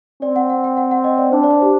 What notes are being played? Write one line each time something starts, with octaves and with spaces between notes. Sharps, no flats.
C4 D5
F#5
F#5
G5
F#5
F#5
D#5
D5
D4 C5
D5
C5
G4